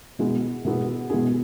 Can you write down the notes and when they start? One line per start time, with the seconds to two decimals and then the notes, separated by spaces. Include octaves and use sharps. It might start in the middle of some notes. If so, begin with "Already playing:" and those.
0.19 B2 G#3 B3 E4 G#4
0.65 B2 G#3 B3 E4 G#4
1.10 B2 G#3 B3 E4 G#4